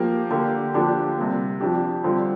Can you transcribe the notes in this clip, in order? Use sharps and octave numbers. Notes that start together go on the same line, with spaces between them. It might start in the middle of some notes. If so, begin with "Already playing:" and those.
Already playing: F3 A#3 G4
D3 A#3 G4
D3 F3 A#3 D4 G4
C3 G3 A#3
F2 F3 D4 G4
D3 G3 C4 F4